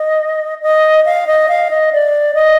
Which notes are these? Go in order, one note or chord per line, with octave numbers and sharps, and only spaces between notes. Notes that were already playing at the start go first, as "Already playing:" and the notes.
Already playing: D#5
D#5
F5
D#5
F5
D#5
D5
D#5